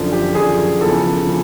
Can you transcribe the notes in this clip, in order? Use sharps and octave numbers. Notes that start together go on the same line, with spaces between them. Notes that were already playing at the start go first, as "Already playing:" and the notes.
Already playing: F#2 D3 F3
G4
F#2 D3 F3 G#4
E2 C#3 F3 A4
C#3 F3